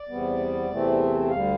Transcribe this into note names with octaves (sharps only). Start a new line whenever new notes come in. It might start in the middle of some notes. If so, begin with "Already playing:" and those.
Already playing: D5
E2 C3 G3 B3
E2 C3 E3 A3 C4
D2 D3 G3 F5